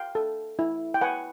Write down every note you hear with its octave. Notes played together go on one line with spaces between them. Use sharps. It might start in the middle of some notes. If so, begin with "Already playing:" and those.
Already playing: F5 G5
A4
E4
G5
B4 F#5 G#5